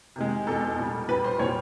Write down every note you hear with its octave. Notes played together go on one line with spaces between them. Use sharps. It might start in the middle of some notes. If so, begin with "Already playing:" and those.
C3 D#3 G#3
E2 B2 G#3 A4
A#2 G3
A#2 G3 B4
C5
A#2 G3 C#5